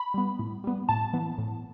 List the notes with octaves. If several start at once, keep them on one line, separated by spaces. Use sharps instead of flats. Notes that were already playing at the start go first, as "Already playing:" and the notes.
Already playing: B5
G3 B3
A2
G3 B3
A2 A5
E3 B3
A2